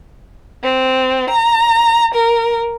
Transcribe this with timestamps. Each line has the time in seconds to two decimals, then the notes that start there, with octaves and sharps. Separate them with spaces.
0.63 C4
1.30 A#5
2.15 A#4